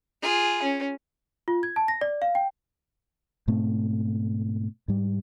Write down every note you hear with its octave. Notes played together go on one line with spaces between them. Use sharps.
F4 G#4
C#4
F4
G#6
A5
A#6
D5
F5
G5
G#2 B2 A3 C4
G#2 G3